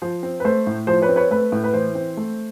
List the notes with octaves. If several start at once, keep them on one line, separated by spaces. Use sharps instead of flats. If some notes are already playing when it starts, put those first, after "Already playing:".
F3 C5
C4
B4
A3 C5
A2
F3 C5
B4 C#5
C4
B4 C#5
A3 B4
A2
B4
E3 C5
C4
A3